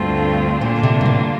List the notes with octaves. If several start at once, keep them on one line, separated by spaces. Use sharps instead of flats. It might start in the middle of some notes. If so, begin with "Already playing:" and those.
Already playing: D2 G2 D3 A3 C4 F4
A#2 D3 G3 A#3 D4 F4
C3
G2
A2